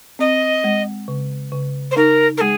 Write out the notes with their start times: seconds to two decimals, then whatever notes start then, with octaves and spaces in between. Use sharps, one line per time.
0.19 C4 D#5
0.64 G#3
1.08 C#3
1.52 C#3
1.91 C5
1.96 D#4 A#4
2.37 A#4
2.41 G#3 G#4